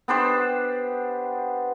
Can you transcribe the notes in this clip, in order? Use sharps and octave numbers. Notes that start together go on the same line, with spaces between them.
B3 D4 G4 C5